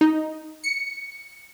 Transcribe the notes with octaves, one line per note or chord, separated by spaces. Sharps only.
D#4
C#7